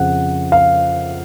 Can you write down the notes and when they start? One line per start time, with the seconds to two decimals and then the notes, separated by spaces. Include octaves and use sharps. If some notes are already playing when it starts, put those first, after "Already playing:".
Already playing: F2 C#3 F3 F#5
0.52 F5